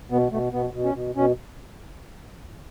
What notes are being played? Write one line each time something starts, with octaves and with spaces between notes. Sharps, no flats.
B2 B3
B2 A3
B2 B3
B2
C#4
B2
B2 C#4